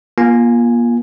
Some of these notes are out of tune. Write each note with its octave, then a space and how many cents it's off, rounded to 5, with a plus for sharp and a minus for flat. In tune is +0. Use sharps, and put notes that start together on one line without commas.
A#3 +35 F4 +0 G#5 +0